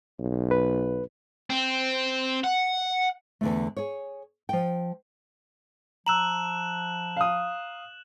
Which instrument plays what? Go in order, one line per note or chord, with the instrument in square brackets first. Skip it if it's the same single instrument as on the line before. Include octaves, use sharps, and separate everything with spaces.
[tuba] B1
[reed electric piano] B4
[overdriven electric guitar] C4
F#5
[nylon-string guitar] E2 D3 A3
G#4 C#5
F3 G5
[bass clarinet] F3 [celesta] A#5 E6 [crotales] F#6 E7 F#7
[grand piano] F5 D#6